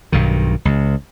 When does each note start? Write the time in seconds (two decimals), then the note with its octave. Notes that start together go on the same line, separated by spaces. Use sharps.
0.12 B1 G2 D#3
0.65 C#2